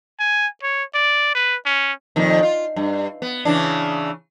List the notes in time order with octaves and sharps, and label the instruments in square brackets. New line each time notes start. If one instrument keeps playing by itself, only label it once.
[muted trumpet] G#5
C#5
D5
B4
C#4
[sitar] F2 A#2 D#3
F4
G2
B3
C#3 E3 D4